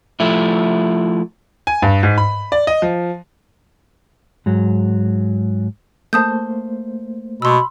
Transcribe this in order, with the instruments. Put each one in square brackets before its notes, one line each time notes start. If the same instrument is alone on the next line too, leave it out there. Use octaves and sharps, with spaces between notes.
[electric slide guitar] F3 A3 E4
[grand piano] G#5
G2
G#2
B5
D5
D#5
F3
[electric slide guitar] G#2 F#3
[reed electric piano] A3 A#3 C5 [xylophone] A5 D#6 G6
[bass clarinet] B2 [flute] B5 [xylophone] C6 E6